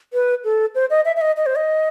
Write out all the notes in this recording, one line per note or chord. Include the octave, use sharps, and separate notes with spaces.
B4
A4
C5
D#5
E5
E5
D#5
D#5
C5
D#5